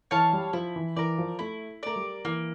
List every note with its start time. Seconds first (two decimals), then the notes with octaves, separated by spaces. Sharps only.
0.11 E3 C#5 F5 A5
0.33 G3
0.53 F3 E4
0.76 E3
0.96 E3 A#4 D5
1.18 F3
1.39 A3 E4
1.83 A3 A#4 D5
1.96 G3
2.25 E3 A#3